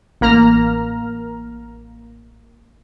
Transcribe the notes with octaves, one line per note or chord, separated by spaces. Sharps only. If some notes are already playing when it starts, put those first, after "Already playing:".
A1 A#3 A#5 F6